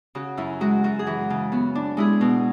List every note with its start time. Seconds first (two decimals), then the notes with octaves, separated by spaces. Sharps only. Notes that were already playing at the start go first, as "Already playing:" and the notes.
0.15 C#3 F#4
0.37 F#2 E4
0.61 G#3 F#4
0.84 F#2 F#4
0.99 G#4
1.07 E3 F#4
1.30 C#3
1.52 B3 F#4
1.75 D4
1.97 G#3 E4 G#4
2.21 B2